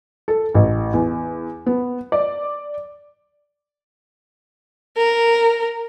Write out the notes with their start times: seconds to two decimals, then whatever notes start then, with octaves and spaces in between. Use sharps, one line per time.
0.28 A4
0.55 A1
0.94 E2
1.66 B3
2.12 D5
4.96 A#4